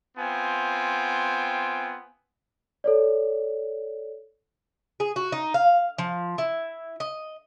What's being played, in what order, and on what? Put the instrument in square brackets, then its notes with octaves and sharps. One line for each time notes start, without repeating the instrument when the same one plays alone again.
[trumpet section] B3 C4 F4 G5 G#5
[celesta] A4 C#5 D5
[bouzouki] G#4
F#4
D#4
F5
F3
E4
D#5